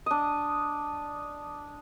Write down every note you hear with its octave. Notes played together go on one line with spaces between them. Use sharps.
D4 D#5